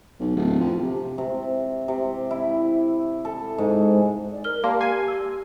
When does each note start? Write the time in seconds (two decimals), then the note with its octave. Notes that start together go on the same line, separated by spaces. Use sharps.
0.20 B1
0.36 D1
0.60 F2
0.82 C3
1.18 C3
1.88 C3
2.31 E4
3.25 A4
3.58 G#2
4.32 D5
4.44 A#4 F6 G7
4.64 A#3 G4 D5 A5 C6
4.81 G#5 C7
5.08 E6